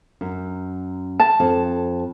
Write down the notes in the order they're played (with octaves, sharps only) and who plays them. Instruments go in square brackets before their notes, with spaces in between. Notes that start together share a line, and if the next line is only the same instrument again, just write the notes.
[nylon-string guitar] F#2
[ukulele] A5
[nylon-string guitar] F2